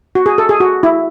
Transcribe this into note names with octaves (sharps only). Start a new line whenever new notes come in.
F#4
G#4
A4
G#4
F#4
E4